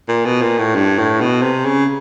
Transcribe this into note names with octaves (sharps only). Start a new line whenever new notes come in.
A#2
B2
A#2
A2
G2
A2
B2
C3
C#3